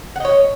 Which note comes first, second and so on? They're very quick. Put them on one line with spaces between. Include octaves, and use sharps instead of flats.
F#5 D#5 C#5